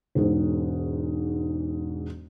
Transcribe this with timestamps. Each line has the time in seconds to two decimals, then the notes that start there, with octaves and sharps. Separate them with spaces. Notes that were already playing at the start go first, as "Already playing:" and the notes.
0.15 E1 G#2